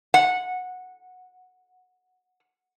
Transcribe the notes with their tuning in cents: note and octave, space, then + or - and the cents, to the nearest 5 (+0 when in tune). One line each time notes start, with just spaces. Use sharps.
F#5 -15